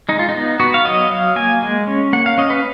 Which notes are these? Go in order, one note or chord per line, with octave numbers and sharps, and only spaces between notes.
G#3 D#4
F4
D#4
B3
B3 F#4
F5
F#3 D#5
F#3 F5
A#3 G#5
G#3
C#4
A#3 F#5
F5
C#4 D#5
B4